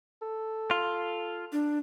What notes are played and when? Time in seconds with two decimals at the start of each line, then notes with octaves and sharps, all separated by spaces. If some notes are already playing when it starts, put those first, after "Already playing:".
0.22 A4
0.71 F4
1.52 D4